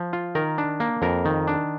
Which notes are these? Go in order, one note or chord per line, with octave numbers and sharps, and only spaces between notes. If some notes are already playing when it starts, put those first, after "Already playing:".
Already playing: F3
F4
D#3 A#4
D4
A#3
F2 A#4
D#3
D4